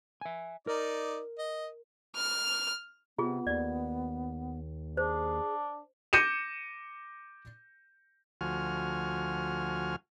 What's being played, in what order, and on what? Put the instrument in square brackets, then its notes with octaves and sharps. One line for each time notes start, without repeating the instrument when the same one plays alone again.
[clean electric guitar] E5 G#5
[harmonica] D#4 D5 [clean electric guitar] A#4
[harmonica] D#5
[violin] F6
[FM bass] C3 [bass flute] B3 [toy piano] F4 G#4
[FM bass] D#2 [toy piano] D5
[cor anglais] D4 [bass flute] G#4 [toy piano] C5
[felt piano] D6 G6 A#6 C#7 D#7 E7
[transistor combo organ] D2 F3 F#4 G#5 F6